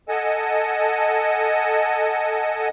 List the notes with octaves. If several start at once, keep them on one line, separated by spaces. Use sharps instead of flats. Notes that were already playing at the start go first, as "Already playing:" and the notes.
A4 D#5 F#5 G#5 A5